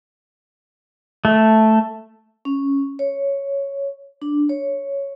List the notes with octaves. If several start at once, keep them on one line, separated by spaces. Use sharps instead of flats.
A3
C#4
C#5
D4
C#5